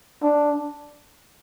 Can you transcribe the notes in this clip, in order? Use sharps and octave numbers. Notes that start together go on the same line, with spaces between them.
D4